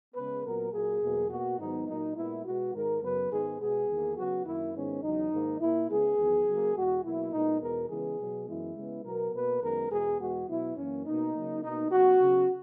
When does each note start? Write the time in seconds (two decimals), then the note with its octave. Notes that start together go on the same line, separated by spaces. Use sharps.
0.15 C#3 G#3 B3 B4
0.44 A#2 F#3 B3 A#4
0.72 A#2 F#3 A#3 G#4
1.02 E2 B2 F#3 A#3
1.30 B2 A#3 F#4
1.59 G#2 D#3 F#3 B3 D#4
1.88 A#2 F#3 A#3 D#4
2.16 A#2 G#3 B3 E4
2.45 B2 G#3 B3 F#4
2.74 G#2 D#3 G#3 A#4
3.02 F#2 C#3 F#3 B3 B4
3.30 G#2 D#3 G#3 B3 G#4
3.60 B2 G#3 B3 G#4
3.89 E2 D#3 A#3
4.17 C#3 F#3 B3 F#4
4.45 F#2 D#3 A#3 E4
4.74 G#2 D#3 G#3 B3 C#4
5.03 E2 C#3 F#3 D#4
5.32 G#2 D#3 A#3
5.60 A#2 A#3 E4
5.89 C#3 G#3 B3 G#4
6.18 E2 D#3 F#3 B3
6.46 C#3 F#3 A#3
6.76 E2 B2 G#3 F#4
7.03 B2 F#3 A#3 E4
7.32 A#2 G#3 B3 D#4
7.61 E2 B2 G#3 B3 A#4
7.89 C#3 E3 G#3 B3 G#4
8.19 B2 F#3 B3
8.47 F#2 E3 G#3 B3 E4
8.76 C#3 G#3 B3
9.04 B2 F#3 B3 A#4
9.33 B2 A#3 B4
9.62 F#2 D#3 G#3 B3 A#4
9.90 E2 B2 G#3 B3 G#4
10.19 E2 B2 G#3 B3 F#4
10.48 B2 F#3 B3 E4
10.76 F#2 E3 A#3 C#4
11.06 B2 A#3 D#4
11.33 C#3 F#3 A#3
11.63 B2 A#3 D#4
11.91 C#3 F#3 B3 F#4
12.19 C#3 F#3 B3